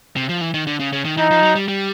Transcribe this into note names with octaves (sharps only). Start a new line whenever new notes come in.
C3
F3
E3
D#3
D3
C#3
C#3
D#3
E3 D#4
F3
F#3
G3
G3